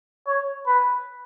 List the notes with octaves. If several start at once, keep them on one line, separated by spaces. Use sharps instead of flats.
C#5
B4